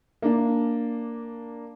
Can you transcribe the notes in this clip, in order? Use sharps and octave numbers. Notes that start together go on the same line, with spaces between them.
A#3 D4